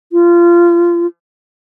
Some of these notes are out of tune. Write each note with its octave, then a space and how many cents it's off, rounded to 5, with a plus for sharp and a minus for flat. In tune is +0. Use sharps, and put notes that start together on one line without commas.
F4 -25